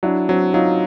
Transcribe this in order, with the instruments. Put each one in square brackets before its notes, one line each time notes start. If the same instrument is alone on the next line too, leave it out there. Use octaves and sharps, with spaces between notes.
[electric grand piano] F#3 [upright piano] D4 E4
[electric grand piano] F#3 [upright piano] C4 D4
[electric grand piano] F#3 [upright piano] D#4 F4